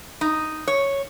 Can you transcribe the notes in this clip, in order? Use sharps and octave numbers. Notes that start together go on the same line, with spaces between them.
D#4
C#5